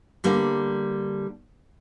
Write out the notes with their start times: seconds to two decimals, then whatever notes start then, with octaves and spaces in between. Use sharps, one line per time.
0.24 D3 G3 A#3